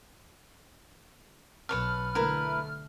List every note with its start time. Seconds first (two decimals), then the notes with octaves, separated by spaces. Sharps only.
1.69 B1 B4 C#5 A5 F6
2.15 D3 A3 E4 A#4 B4